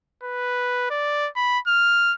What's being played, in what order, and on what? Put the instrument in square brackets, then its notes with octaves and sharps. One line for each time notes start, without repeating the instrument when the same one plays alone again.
[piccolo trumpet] B4
D5
B5
F6